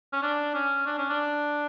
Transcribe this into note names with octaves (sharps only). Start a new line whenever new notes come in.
C#4
D4
C#4
D4
C#4
D4